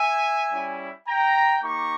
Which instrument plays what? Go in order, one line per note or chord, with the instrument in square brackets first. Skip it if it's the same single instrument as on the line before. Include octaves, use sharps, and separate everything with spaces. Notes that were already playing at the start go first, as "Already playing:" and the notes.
Already playing: [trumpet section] E5 G#5
G3 C#4 E4
G5 A#5
A#3 D#4 G4 A#5 C#6